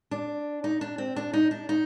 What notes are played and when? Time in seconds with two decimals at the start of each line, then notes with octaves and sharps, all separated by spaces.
0.11 D4
0.64 D#4
0.81 D4
0.98 C4
1.16 D4
1.33 D#4
1.51 D4
1.69 D#4